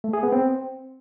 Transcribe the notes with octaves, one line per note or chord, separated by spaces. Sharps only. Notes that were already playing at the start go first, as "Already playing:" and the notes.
A3
G#4
B3
C4